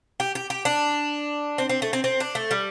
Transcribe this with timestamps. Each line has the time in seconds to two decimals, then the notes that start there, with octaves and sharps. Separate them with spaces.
0.20 G4
0.35 G4
0.50 G4
0.65 D4
1.58 C4
1.69 C4
1.82 A3
1.93 C4
2.04 C4
2.20 D4
2.35 A3
2.51 G3